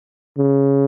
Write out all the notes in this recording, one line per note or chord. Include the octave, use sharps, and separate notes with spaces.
C#3